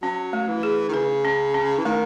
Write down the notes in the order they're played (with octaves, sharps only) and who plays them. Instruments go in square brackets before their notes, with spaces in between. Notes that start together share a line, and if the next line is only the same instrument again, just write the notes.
[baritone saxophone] F#3 [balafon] C#4
[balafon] A3
[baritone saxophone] E3
[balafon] G#4
[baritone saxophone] D#3
[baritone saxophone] C#3 [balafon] B4
[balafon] C#4
C#4
[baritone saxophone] E3
[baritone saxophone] D#3 [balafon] A3